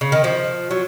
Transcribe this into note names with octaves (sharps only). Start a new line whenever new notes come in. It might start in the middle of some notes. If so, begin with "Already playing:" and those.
C#3
D#3
F3
F#3